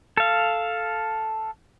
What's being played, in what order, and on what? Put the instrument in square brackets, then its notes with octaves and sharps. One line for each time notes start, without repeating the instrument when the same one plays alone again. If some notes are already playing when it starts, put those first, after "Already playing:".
[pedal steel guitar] A4 F5